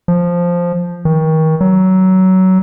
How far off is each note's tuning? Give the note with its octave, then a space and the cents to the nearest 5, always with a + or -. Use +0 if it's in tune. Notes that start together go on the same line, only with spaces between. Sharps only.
F3 +0
D#3 +30
F#3 +20